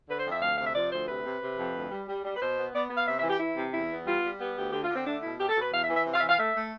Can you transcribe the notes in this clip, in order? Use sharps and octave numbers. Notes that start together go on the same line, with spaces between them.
D3 B4
C5
F2
E5
D2 F5
C3 F5
E5
F3 D5
D2 C5
C3 B4
C3
C3
F2
D2
G3
G3
G3
B4
B2 C5
B3
B3 D5
B3
F5
C3 E5
E5
E3
G4
E3 E4
C3
E2 E4
B3
G3 F4
G3
B3 G4
D2 G4
D3 G4
F4
D3
C4
A3 D4
B2 E4
B2 G4
A4
B2
B4
E2 F5
E5
E3
E5
C3
F5
E3 E5
F5
A3 E5
A3